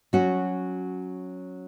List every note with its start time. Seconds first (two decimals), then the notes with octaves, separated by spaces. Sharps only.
0.13 F#3 C#4 F#4